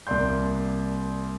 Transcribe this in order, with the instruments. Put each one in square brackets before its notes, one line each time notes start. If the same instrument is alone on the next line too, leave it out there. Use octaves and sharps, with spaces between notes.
[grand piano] C2 A#3 D5 C6 G6